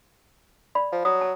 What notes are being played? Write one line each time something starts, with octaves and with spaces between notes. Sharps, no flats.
D5 B5
F3
F#3 D#6
A5